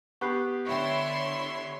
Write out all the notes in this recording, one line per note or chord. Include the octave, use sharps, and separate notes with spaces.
B3 G4 B4 C#6 F#6 C7
D3 E4 C#5 E5 G5 C6 C#6